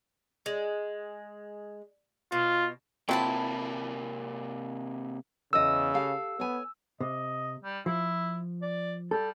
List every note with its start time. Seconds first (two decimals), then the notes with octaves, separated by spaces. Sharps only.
0.46 G#3
2.32 B2 F4
3.09 C3 F#3 A#3 C4 E4 F4 A5 B5
5.53 E2 C#3 D#5 E6
5.94 G4 A4 F5
6.40 B3 C#5 G#5
7.00 C3 D#5
7.63 G3
7.86 F3 E4
8.62 D5
9.11 G3 A4